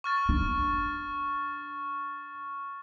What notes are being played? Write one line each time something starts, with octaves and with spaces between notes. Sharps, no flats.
C#6 F6 A6
D4